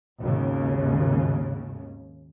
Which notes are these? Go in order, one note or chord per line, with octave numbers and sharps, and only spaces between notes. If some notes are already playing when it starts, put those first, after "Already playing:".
G#1 D#2 C#3